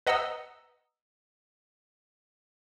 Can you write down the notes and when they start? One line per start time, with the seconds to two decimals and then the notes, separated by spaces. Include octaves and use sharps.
0.07 B4 D#5 F#5 A#5 D#6 E6